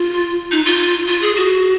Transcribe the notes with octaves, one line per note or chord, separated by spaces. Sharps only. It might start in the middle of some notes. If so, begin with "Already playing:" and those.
Already playing: F4
D#4
F4
F4
G#4
F#4